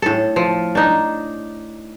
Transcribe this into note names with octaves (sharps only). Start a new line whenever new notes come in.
A2 A4
F3
D4 D#4